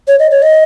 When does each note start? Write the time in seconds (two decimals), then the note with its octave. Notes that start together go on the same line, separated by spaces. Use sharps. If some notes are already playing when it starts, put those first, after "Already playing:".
0.08 C#5
0.19 D#5
0.31 C#5
0.42 D#5